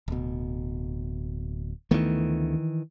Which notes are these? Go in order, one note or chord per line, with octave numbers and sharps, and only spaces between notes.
D1 B2
D2 D#3 E3 A3 B3